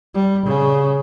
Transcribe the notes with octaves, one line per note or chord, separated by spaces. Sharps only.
G3
C#3